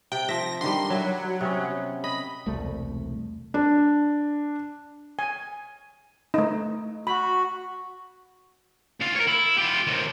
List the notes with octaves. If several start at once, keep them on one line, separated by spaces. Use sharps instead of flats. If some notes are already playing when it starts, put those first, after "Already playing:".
C3 G5
F3 E5 A#6
D3 D#3 G3 C6
F#3 E4 E5
C3 B3 C#4
D#5 B5
E1 C2 A3
D4
G#5
A3 D#4
F#4 B5
D2 F4
A#4 C#5
E4
F4 G4
D#2 C3